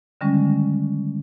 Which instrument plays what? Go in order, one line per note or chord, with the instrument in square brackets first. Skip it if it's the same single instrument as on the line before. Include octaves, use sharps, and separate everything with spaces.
[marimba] D3 D#3 G3 G#3 C#4